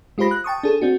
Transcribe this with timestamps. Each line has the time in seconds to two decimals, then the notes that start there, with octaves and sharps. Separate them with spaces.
0.18 G#3 F4 G4 C5 B5 A#6
0.31 F#6
0.44 G5 A5 C#6 D#6
0.63 D4 G#4 A4
0.81 C4 D4 F#4